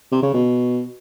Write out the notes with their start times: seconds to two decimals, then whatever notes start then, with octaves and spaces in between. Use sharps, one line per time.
0.12 C3
0.23 C#3
0.33 B2